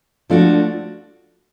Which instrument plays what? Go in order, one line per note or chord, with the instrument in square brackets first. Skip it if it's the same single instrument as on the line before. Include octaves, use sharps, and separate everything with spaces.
[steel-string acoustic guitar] F3 A3 D4 F#4